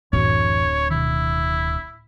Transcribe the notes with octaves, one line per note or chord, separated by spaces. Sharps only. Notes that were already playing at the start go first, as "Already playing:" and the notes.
D1 F#2 E3 C#5
B2 D#3 E4